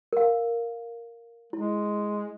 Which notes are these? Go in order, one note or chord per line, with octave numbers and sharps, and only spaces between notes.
A#4 F5
G#3 E4